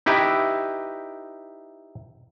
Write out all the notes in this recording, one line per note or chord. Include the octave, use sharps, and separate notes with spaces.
D#4 E4 G4 B4